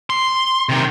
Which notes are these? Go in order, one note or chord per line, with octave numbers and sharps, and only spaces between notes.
C6
C3 D#3